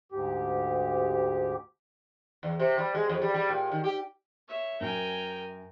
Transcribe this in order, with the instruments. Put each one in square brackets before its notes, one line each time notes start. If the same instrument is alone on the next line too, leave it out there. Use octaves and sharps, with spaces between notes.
[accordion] D2 G#2 G4
[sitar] E2
C3
G3
G#3
F2
G3
G3
A#2
D#3
G4
[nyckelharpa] C#5 E5
[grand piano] F#2 [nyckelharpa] A#4 G#5 [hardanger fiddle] G5 A#5